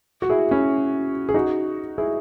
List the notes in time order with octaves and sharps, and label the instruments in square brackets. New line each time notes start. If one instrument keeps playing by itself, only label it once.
[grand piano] F#4
E4 G#4
C#4 E4
G#4
D#4 F#4
E4 G#4